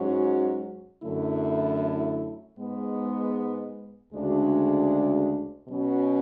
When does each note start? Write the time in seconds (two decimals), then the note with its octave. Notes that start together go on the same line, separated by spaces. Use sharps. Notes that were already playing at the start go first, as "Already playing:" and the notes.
Already playing: G#2 F#3 C#4 F#4
1.03 F#2 D3 A3 E4
2.58 G#2 G#3 B3
4.13 D2 C#3 G#3 D4 F#4
5.69 B2 F#3 C#4 F#4